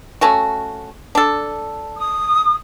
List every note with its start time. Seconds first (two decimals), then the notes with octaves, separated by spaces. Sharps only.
0.21 A3 C#4 F#4
1.15 D4 A4
1.97 D#6